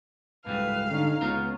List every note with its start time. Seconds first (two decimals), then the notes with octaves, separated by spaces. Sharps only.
0.46 C#2 G#2 G3 A3 B4 F5
0.90 D3 C#4 D#4
1.21 C#2 B3 C#4 F4 A#5